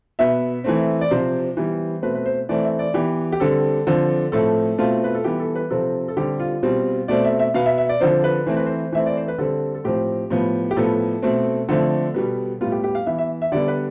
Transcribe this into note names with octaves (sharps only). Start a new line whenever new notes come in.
B2 B3 E5
E3 A3 C4
D5
C3 F3 C4 C5
E3 G3 B3
B2 A3 C4 B4
B4
C5
E3 A3 C4 D5
E5
D5
E3 B3 G4
G4
D3 G3 C4 A4
D3 F3 C4
A2 F3 A3 C4 A4
B2 A3 C4 F4
B4
A4
E3 G3 B3 G4
A4
B4
C3 F3 C4 A4
A4
D3 G3 C4 G4
F4
B2 G3 C4
B2 A3 C4 D5
E5
E5
B2 B3 F5
E5
E5
D5
D3 F3 C4 C5
B4
E3 A3 C4 C5
B4
C5
E3 A3 C4 E5
D5
C5
B4
D3 G3 C4 A4
A4
A2 F3 C4 G4
A2 F3 B3
G4
A2 F3 B3 A4
B2 A3 C4
D3 F3 A3 C4
B2 G3 B3
A2 G3 B3 F4
G4
G4
F5
E3 B3 E5
E5
E5
D3 G3 B3 D5
B4